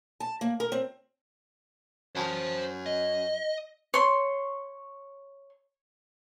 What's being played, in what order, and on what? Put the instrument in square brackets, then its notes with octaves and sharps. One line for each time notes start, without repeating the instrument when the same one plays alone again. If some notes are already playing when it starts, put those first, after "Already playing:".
[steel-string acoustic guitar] A5
A#3
A#4
C4
[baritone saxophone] F#2 [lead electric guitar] C5 A5
[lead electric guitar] D#5
[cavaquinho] C#5 C6